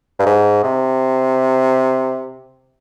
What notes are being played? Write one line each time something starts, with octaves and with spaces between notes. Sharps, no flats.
G2
G#2
C3